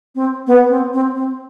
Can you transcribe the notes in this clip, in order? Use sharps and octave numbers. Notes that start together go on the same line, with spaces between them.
C4
B3
C4
C4
C4